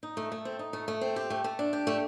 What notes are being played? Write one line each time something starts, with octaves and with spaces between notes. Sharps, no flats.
D#4
A3
A3
C4
D#4
A3
A3
C4
G4
A3
A3
D4
G4
A3